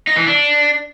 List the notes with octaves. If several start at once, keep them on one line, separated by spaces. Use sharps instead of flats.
D#4
E3
D4